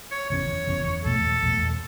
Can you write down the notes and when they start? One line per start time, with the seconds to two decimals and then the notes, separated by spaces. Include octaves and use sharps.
0.11 C#5
0.30 F#1 E2 C#3 C#5
0.67 F#1 E2 C#3
1.05 E2 B2 A3 A4
1.42 E2 B2 A3